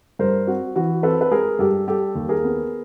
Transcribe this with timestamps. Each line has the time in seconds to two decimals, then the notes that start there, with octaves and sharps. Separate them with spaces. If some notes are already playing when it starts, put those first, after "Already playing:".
0.19 G2 A#4 C5
0.47 C4 F#4
0.76 E3 F#4
1.03 C4 A4 B4
1.21 B4
1.31 G#3 G#4 A#4
1.59 G2 G4 A4
1.88 G3 G4 A4
2.15 D#2
2.29 G#4 A#4
2.44 B3